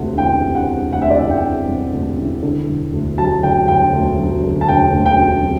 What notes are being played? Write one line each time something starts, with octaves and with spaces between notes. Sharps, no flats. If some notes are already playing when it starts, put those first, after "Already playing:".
Already playing: E1 D2 C3 F#5
E3 G5
C3
F#5
E1
D2 F#5
E5
D5
E3 E5
G5
C3
E1
D2
E3
D3
E1
D2
F#3 A5
D3 G5
E1 G5
D2
F#3
D3
A5
E1 G5
D2
G5
F#3
C3